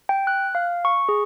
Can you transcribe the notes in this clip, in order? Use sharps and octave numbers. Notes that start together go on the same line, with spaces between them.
G5
F#6
F5
C#6
G#4